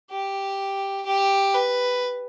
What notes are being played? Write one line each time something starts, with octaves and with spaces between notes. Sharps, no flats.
G4
G4
B4